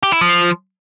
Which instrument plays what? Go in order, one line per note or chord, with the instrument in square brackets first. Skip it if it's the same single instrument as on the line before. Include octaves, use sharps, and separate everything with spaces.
[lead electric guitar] G4
E4
F3